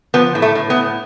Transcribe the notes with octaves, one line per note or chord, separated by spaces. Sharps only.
F3 B3
A2
A3
A2
B3
A2